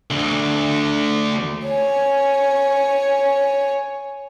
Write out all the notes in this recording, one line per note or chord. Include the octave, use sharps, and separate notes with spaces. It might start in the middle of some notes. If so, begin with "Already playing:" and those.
D2 D3
C#5 G#5